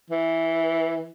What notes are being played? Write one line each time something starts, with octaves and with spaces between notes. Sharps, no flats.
E3